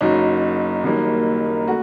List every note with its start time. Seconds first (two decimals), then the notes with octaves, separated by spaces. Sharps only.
0.01 F#1 F#2 F#3 D#4
0.84 F#1 F#2 D#3 G3 A#3
1.68 A3 F#4